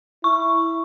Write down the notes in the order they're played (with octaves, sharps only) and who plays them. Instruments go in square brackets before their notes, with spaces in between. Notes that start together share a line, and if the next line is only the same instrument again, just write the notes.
[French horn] E4 [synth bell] C#6